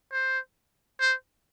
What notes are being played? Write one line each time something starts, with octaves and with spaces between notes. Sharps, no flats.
C5
C5